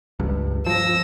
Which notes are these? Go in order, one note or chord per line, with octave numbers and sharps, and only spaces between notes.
C#2 G2
F3 E6 A#6